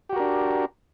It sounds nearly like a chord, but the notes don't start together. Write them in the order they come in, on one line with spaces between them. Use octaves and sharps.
G4 F#4 A#4 D4